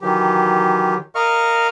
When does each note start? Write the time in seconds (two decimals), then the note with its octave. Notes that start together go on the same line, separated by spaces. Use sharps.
0.01 D#3 E3 F#3 G4
1.15 A#4 D#5 F5 C#6 F6